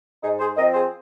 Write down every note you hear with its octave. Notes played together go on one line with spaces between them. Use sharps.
G#2 D#4 G#4
G#4 C5
F3 C4 A#4 D#5
G#4 C5